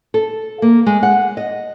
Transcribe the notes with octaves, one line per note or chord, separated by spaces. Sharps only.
A4
A#3
G#3
F#5
D#5